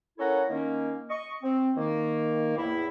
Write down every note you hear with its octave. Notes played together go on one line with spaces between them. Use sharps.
A#3 C#4 E4 A4 F#5 A#5
D#3 A#3 C#4
D#5 C#6
C4
D#3 A#3
E2 A2 E4